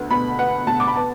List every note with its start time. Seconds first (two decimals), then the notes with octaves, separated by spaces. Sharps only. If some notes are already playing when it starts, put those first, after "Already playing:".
Already playing: D2 B3
0.10 B2 B5
0.39 B3 F#5
0.67 B2 A5
0.80 D6
0.88 B5
0.96 B3 A5